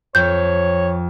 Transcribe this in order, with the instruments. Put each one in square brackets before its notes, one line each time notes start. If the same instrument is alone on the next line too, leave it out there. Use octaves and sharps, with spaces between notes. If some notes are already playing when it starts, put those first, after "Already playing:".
[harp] F2 [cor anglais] C#5 [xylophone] G6